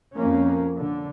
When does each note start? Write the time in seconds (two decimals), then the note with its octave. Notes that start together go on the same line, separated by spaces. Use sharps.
0.16 F2 A#3 C#4
0.75 D3